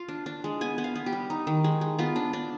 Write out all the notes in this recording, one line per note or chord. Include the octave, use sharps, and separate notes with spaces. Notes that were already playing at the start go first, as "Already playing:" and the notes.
Already playing: F4 F5
D4
D4
G#3
B3 G#5
B3
F5
B3
G4
G3
D#4
D#3
G#3
G#3
B3 F4
D4
D4